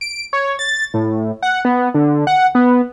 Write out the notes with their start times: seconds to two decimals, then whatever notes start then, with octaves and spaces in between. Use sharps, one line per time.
0.01 D7
0.33 C#5
0.59 A6
0.94 A2
1.43 F#5
1.65 B3
1.94 D3
2.27 F#5
2.55 B3